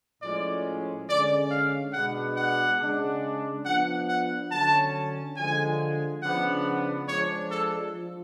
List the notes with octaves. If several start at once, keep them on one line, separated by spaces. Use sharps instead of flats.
A2 F3 G#3 C#4 D5
D3 G#3 C#4 D5
F5
B2 G#3 B3 D4 F#5
F#5
C#3 G#3 D4
F3 B3 D4 F#5
F#5
D3 F#3 C#4 A5
D3 F3 G#3 G#5
C#3 F3 B3 D4 F#5
F3 G#3 D4 C#5
A4
F3